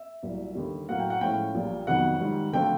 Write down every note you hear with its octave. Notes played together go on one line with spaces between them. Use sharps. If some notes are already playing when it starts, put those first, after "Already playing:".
Already playing: E5
C2 A#2 F#3
D#2 D3 G3
A2 F#3 A#3 F#5
G5
F#5
A2 F3 G#3 C#4 E4 G5
A#1 A#2 G3
F2 C3 D#3 F#3 B3 F#5
G#2 D#3 G3
D2 D3 F3 A3 C4 G5